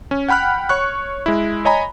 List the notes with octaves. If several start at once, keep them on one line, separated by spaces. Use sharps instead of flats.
C#4
F#5 G5 B5 F6 F#6
C#5 C#6 F#6
G#3 E4
C#5 D#5 G#5 A#5 B5